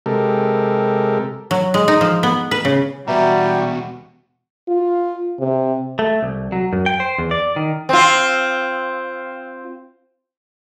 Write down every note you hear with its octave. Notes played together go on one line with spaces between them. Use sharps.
C3 G#3 G4 A4 A#4
F#3
G#3
D#4
F3
B3
B4
C#3
E2 B2 G3 F#4 B4 E5 A#5
F4
C3
A3
C2
F#3
F#2
G5
C5
E2
D5
D#3
C4 F4